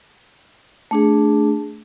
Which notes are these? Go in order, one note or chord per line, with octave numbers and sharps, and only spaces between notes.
A3 D4 G#4